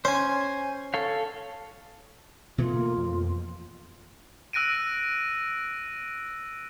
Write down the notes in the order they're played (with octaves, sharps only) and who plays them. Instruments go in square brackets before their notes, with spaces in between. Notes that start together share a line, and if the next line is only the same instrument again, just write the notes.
[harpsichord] C#4 [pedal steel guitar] C5 G#5
[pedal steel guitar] A4 C#5 F5
[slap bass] B2 E3 A3 [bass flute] F4
[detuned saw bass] A#3
F2
[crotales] E6 F#6 A#6 D7 D#7